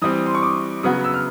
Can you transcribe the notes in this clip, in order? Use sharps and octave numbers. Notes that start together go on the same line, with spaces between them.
E3 G3 C4 D#6
C6
C#6
D6
C#3 F#3 B3 D#6
E6
F6